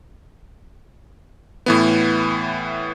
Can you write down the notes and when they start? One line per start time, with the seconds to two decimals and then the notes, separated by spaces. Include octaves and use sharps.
1.66 A2 E3 B3